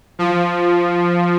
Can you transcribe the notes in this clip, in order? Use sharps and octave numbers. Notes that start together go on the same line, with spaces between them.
F3